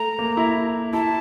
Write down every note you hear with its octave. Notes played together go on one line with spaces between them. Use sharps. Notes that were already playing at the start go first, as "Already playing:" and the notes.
Already playing: A3 A#5
A#3
E4
E4 A5